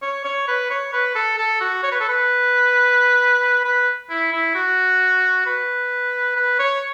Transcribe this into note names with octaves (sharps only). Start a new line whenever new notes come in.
C#5
C#5
B4
C#5
B4
A4
A4
F#4
C#5
B4
A4
B4
B4
E4
E4
F#4
B4
B4
C#5